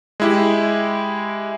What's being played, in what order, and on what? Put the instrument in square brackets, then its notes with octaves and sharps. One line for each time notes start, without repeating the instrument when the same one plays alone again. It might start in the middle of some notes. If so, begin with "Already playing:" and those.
[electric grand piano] G#3 E4 G4